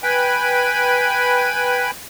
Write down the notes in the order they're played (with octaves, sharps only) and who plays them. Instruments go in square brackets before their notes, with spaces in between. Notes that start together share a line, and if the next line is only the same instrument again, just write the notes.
[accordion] B4 G5 G#5 B5